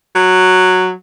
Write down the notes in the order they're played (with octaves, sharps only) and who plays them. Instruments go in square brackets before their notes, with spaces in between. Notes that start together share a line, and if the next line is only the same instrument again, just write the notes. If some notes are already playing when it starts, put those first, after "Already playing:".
[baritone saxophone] F#3